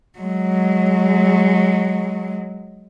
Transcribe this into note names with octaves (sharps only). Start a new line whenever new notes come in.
F#3 G#3